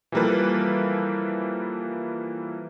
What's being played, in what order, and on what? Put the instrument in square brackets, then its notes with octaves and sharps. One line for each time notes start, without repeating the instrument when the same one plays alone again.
[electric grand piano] E3 F3 G3 A#3 A4 B4